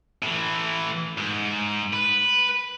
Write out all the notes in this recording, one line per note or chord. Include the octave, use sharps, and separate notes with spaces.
A2 E3
G#2
B4